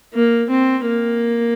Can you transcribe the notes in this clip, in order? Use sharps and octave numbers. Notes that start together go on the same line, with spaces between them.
A#3
C4
A#3